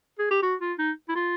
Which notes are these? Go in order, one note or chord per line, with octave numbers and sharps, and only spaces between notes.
G#4
G4
F#4
F4
D#4
E4
F4